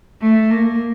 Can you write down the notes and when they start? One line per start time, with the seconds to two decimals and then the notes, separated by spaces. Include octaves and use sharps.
0.22 A3
0.51 A#3